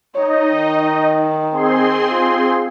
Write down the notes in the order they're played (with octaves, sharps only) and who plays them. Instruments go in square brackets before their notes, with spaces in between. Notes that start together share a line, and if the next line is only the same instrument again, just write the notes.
[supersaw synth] D#4 D#5 [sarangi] C#5
[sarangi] D#3
[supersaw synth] C4 G#4 C6
[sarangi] F4